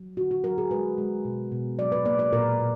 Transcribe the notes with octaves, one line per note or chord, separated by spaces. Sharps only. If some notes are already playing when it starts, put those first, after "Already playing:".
Already playing: F#3
D3 F#4
F#4
F#3 A#4
G#4
G#3 B4
G#3
B2
B2
F#3 D5
B4
A#3 D5
D5
A#2 A#4
A#2